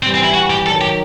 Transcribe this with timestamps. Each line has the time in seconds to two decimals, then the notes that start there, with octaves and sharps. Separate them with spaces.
0.03 E3 G3 C4
0.14 C4
0.24 E4
0.34 F#4
0.50 G4
0.66 D#3 F#3 A4
0.81 G4